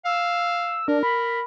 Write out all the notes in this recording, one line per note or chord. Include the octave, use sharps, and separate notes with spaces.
F5 E6
D4 A#4
B5